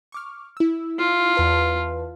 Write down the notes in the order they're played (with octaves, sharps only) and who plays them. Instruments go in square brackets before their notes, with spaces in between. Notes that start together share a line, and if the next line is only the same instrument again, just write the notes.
[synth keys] C#6 D6 F6
E4 E6
[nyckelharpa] F4
[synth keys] E2 B4 A5